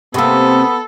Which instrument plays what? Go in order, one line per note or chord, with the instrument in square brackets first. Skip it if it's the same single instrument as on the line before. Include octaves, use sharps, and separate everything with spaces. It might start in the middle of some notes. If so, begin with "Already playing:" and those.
[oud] C3 A#3 [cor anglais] B3 [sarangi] A4